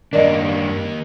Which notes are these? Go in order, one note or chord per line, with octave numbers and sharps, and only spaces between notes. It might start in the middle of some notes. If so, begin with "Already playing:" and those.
F#2 D#3 A#3 D4 A#4 D5 D#5